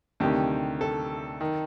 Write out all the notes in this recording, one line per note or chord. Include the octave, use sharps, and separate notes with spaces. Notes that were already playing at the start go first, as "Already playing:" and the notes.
D2 C3 D#3 G4
A4
D#3